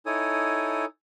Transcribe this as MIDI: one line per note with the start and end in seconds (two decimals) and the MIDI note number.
0.06 0.85 63
0.06 0.85 64
0.06 0.85 69
0.06 0.85 73
0.06 0.85 80
0.06 0.85 87